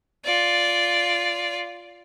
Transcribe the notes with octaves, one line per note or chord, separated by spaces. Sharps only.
F4 D5